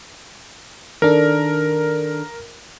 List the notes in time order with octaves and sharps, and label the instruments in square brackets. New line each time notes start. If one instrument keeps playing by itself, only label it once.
[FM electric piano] D#3 D4 A4 [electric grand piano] A#4